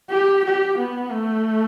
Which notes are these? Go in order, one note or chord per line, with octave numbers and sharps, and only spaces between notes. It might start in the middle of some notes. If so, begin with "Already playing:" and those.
G4
G4
B3
A3